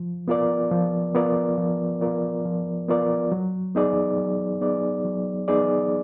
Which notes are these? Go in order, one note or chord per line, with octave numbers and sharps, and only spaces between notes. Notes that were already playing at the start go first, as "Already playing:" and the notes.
Already playing: F3
B3 F4 A#4 D5
F3
B3 F4 A#4 D5
F3
B3 F4 A#4 D5
F3
B3 F4 A#4 D5
F#3
B3 D#4 G#4 D5
F#3
B3 D#4 G#4 D5
F#3
B3 D#4 G#4 D5